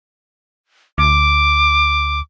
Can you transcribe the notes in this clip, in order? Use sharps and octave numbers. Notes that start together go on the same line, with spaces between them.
D2 D6